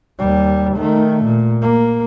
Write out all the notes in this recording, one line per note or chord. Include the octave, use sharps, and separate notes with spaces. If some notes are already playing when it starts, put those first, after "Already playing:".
D#2 G3
D#3 A3
A#2
A#3